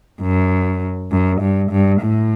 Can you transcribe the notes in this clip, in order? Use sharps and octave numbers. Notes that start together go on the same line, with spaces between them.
F#2
F#2
G2
G2
A2